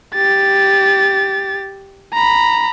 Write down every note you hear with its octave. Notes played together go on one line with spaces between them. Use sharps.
G4 A6
A#5 B5